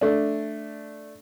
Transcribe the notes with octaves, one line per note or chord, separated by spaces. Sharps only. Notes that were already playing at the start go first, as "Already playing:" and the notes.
A3 D4